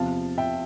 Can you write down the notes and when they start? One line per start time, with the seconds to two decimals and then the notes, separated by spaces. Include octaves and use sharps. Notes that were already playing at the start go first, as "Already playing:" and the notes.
Already playing: E2 C3 F3 C4 F5 A5
0.38 E5 G5